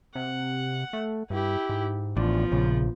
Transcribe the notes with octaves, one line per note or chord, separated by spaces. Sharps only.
C3 F#5
A3
G2 E4 G4
G#2
A1 F3 B3 D4
A#1 C#3